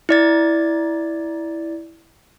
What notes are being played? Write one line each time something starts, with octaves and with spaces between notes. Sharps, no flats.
E4 D5 A6